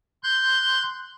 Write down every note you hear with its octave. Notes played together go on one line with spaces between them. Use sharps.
C6 F#6 G6